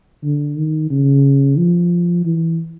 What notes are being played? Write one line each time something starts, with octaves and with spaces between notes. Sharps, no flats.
D3
D#3
C#3
F3
E3